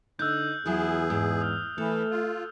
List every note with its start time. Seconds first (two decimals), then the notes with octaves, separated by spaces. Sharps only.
0.19 D3 D#4 E6 F#6 G6
0.66 E2 F#3 E4 F4 G#4
1.10 G#2
1.41 D#6 F6
1.78 E3 A3 A4
2.11 F4